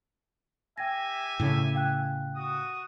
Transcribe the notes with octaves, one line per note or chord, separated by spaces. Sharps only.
G4 E5 G5 G#5 A#6
A2 C#3
F5 G5 F#6
F#4 D#6